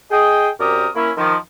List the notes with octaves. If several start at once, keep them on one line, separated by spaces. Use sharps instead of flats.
G#4 D#5 G5
F#2 C4 G4 A#4 D5 D#6
A#3 C#4 E4
D#3 F3